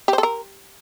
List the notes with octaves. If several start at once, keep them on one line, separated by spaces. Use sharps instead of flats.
G4
C5
A4
A#4